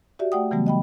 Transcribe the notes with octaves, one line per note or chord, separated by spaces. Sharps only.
F#4 G4 D5 E5
A3 D5 F#5 G5 D#6
C#3 E3 F#3 G3 A3 B3
D#5 G5 B5